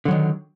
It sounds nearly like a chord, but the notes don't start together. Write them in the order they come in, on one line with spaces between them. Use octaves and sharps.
D3 F#3 D#3